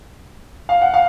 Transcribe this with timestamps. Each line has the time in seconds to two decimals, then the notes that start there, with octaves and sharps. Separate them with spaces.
0.69 F5
0.82 F#5
0.94 F5